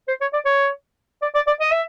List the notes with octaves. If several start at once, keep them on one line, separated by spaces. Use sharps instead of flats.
C5
C#5
D5
C#5
D5
D5
D5
D#5
E5